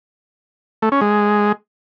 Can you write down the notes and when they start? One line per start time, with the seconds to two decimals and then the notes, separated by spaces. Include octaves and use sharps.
0.82 A3
0.92 C#4
1.01 G#3